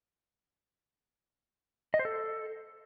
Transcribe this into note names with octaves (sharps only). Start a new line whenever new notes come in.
D#5
C5
A4